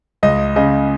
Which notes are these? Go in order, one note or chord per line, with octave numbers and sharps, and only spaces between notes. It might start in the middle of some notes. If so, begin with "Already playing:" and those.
C#2 D#5
C#3 D#5